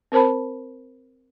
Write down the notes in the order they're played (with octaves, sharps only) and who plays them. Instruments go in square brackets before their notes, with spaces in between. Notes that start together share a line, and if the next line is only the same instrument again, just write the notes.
[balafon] C4 A#4 C5 A5 B5